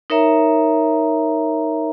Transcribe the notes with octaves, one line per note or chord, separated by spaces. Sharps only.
D#4 A#4 C#5 E5 A#5